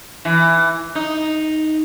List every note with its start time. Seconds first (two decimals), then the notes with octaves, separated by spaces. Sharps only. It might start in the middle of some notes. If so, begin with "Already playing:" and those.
0.25 E3
0.95 D#4